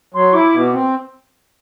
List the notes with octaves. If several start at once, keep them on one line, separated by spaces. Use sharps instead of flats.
F#3 C6
E4 D6
B2
C4